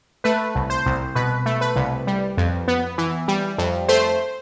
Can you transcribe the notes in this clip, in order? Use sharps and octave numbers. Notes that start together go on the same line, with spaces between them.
A3 B4
C2
C5
C2
B2 B4
A3
B4
C2
G3
F2
B3
E3
G3
F2
A3 C5